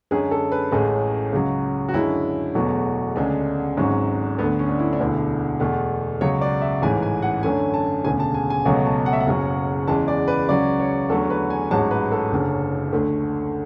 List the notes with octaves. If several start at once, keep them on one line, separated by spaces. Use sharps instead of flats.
F#2 D3 G#3 G#4
A4
B4
A1 A2 G#3 G#4
C#2 C#3 F#3
F#4
F#2 D3 G#3 E4
E1 E2 B2 F#3 A3
D2 C#3 G#3 D4
G#1 G#2 F#3 C#4
D2 D3 A3 B3
C#4
D4
E4
D4
E1 D2 D3 E4
E2 B2 A3
C#2 C#3 F#3 C#5
D5
E5
A1 G#2 E3 G#5
G#5
F#5
F#2 D3 A3 G#5
A5
E1 D2 C#3 G#5
A5
G#5
G#5
C#2 B2 F#3 A3
A5
F#5
E5
F#5
F#1 F#2 C#3 F#3
E2 C#3 E3 G#3 A5
D5
B4
C#2 C#3 F#3 D5
C#5
E2 D3 F#3 A3 A4
B4
G#5
A1 G#2 F#3 A5
B4
A4
F#1 F#2 D3
D2 D3 A3